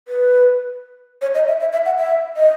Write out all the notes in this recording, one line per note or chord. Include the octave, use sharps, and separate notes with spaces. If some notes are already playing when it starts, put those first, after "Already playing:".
B4
C#5
D#5
E5
E5
E5
F#5
E5
D#5